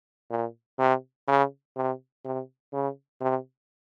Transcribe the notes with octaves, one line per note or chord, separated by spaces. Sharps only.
A#2
C3
C#3
C3
C3
C#3
C3